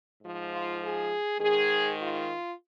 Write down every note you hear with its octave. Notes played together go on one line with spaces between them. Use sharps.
G#2 F3
F4
G#4
G#2 D#3 G#4
F4